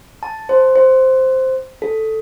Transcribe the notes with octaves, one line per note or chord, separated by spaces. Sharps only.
A5
C5
C5
A4